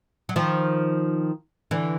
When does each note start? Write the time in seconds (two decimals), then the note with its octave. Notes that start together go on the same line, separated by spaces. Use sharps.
0.29 F#3
0.36 D#3 F3
1.71 D3 E3